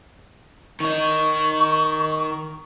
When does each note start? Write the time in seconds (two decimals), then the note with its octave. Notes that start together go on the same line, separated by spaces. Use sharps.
0.80 D#3 D#4 C#6